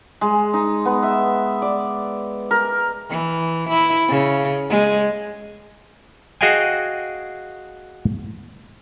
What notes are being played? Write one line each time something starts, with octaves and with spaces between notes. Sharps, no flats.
G#3
D#4
B3
E5
D5
A#4
E3
E4
C#3
G#3
F#4 G#4 D#5 F5 G5 G#5